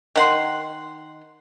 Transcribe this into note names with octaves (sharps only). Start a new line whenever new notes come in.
D#3 F#5 C6